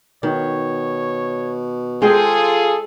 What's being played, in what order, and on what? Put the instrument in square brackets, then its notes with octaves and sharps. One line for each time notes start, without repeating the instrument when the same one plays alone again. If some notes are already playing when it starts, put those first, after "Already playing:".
[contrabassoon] B2 [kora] D#3 [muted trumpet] C#5
[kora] G#3 C5 G5 [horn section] F4 G#4 [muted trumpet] A4